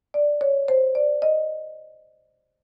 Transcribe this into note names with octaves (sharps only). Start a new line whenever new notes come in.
D5
C#5
C5
D5
D#5